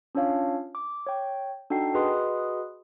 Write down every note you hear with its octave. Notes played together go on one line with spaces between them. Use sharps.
C#4 D4 F4 C#5 F5
D6
C#5 G5
D4 D#4 F#4 A4 G5 C7
F#4 G#4 B4 D#5 C6 D#6